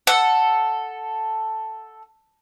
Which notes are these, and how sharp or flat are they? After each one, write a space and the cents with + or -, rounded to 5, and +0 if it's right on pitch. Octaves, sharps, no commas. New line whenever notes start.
A4 +0 F#5 -5 E6 +0